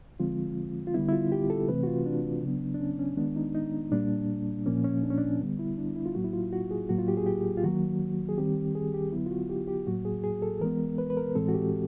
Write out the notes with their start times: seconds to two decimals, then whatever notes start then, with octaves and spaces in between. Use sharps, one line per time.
0.20 D3 F3 G#3 C4 F4
0.87 F4
0.94 D3 G3 B3 E4
1.09 E4
1.13 F4
1.32 G4
1.50 A4
1.68 C3 E3 A3 C4 B4
1.83 F#4
1.87 F4
2.06 D4
2.43 C#3 F#3 B3
2.74 D4
2.80 C#4
2.99 C#4
3.17 D#3 G#3 B3 D4
3.36 D#4
3.54 D#4
3.92 A#2 G3 A#3 D4
4.66 A#2 F3 A#3 C#4
4.84 C#4
5.03 D4
5.10 C#4
5.18 D4
5.40 D3 G3 B3
5.59 E4
5.78 D4
5.96 E4
6.06 F4
6.15 A2 F#3 A#3 F#4
6.24 E4
6.33 F4
6.53 F#4
6.71 G#4
6.89 A2 F#3 A#3 F#4
6.98 F4
7.08 G4
7.17 G#4
7.27 G4
7.57 F4
7.64 D#3 F#3 A#3 F#4
8.29 G#4
8.38 D#3 G3 C4 G4
8.75 G#4
8.94 G4
9.12 D3 F#3 B3 E4
9.26 F4
9.31 F#4
9.49 G4
9.68 G4
9.87 A2 F#3 A#3 F#4
10.05 G#4
10.24 G#4
10.42 A4
10.61 E3 G#3 B3 A#4
10.98 B4
11.10 B4
11.17 A#4
11.35 A2 E3 G#3 C4 A4
11.48 F#4
11.54 G4